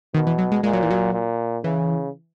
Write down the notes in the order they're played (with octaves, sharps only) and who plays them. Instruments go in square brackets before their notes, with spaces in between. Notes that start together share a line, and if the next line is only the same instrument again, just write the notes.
[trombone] B2 [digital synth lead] D#3
[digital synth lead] E3
F#3
G#3
[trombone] A#2 [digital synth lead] G#3
[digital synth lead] F#3
E3
F#3
[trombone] A#2
[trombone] C#3 [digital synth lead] E3